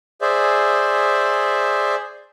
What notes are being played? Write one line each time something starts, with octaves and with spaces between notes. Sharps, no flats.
G#4 C5 D5 E5